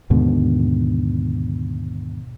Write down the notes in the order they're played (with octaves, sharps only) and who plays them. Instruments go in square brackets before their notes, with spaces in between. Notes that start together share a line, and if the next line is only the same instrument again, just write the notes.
[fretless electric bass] D#2 G#2 B2 D3